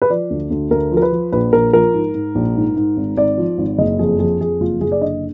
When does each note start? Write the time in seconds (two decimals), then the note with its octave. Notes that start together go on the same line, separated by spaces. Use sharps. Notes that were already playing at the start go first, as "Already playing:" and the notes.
0.02 B4
0.10 F3 D5
0.30 D2
0.50 D2
0.71 D2 A#4
0.91 F3
0.97 A#4
1.02 B4
1.12 F3
1.32 A#1 B4
1.53 A#1 A#4
1.73 F3 A#4
1.94 G#2
2.14 G#2
2.35 A#1
2.56 G#2
2.76 G#2
2.97 G#1
3.17 G#1 D5
3.38 F3
3.58 G#1
3.78 F#1 D#5
3.99 F2 G#4
4.19 F2 G#4
4.40 F2 G#4
4.60 F#1 F4
4.81 F#1 G#4
4.92 D5
5.01 D3 D#5